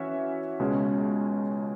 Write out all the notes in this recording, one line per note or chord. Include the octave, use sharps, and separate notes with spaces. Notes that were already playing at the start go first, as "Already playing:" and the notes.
Already playing: E3 C#4 F#4 C#5 E5
C#2 B2 G#3 C#4